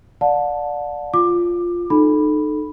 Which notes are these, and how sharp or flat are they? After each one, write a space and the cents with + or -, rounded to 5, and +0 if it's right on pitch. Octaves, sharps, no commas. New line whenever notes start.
D5 +0 F#5 -45 A5 +0
F4 +0 D6 +15
D#4 -30 A4 -15 B5 +0